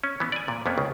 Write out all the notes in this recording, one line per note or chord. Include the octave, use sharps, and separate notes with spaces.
C#4
E3 B3
D5 G#5
A#2
F2 A#3 B3 C#4
C#2 C#3